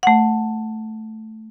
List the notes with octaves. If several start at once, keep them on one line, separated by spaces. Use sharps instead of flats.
A3 F#5